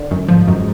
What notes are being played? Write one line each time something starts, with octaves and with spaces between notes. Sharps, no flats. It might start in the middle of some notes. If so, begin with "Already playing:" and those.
Already playing: D3
F#2
G#2 F3
F#2